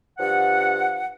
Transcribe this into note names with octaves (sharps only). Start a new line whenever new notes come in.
G2 F3 F#5